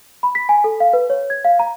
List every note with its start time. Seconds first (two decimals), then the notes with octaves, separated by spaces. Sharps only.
0.23 B5
0.35 B6
0.49 G#5
0.64 A4
0.80 F5
0.93 B4
1.10 C#5
1.30 G#6
1.45 F5
1.59 A#5